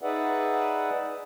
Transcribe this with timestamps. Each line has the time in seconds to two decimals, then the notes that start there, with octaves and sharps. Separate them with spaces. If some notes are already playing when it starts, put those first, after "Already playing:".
0.01 D#4 G#4 B4 D5 E5 F#5